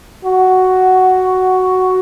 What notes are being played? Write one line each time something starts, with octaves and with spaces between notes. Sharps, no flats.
F#4